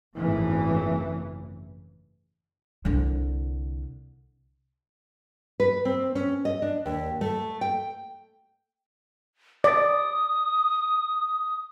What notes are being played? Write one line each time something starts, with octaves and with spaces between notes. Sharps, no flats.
G#1 F#2 A#2 C#3 E3 A3
C2 D3
B4
C4
C#4
D#5
D4
D#2
A3
G5
D5 D#6